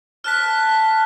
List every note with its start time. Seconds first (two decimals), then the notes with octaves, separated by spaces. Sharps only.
0.24 A5 F6 F#6 B6